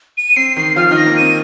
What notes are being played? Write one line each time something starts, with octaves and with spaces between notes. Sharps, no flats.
D#7
C4 C7
D#3 D#4 C7
F3 F4 F6
D#3 D#4
A#6
A#3
C4 D#7